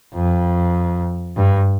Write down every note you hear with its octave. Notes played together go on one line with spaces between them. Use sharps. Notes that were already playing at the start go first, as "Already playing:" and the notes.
F2
G2